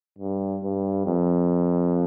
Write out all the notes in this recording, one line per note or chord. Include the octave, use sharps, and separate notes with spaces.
G2
G2
F2